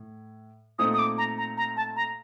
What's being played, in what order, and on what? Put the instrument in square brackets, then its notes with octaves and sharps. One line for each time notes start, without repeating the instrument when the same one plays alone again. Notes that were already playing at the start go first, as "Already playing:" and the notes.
Already playing: [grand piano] A2
[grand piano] A#2 A3 C4 D#4 [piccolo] D#6
[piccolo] D#6
D6
A#5
A#5
A#5
A5
A#5